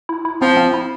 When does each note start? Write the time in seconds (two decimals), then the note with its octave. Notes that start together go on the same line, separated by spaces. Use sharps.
0.09 E4
0.25 E4
0.41 F3 C4
0.57 C4
0.74 E4